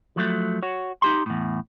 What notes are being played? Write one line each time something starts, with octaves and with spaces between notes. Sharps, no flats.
F3 F#3 A3
F#4 C#5
D#4 G4 C6
E2 A2